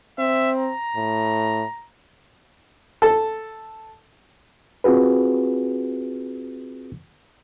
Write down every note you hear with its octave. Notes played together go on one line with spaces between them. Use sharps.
C4 E5
A#5
A2
A4
C4 F4 F#4 G#4 B4